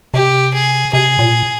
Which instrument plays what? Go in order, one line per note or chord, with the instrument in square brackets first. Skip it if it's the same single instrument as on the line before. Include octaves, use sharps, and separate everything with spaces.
[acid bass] C3 [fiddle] G4
[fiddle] G#4
[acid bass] C3 [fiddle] G#4
[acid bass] A#2